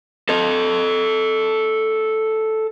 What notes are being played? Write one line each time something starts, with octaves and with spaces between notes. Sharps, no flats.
A4 D#5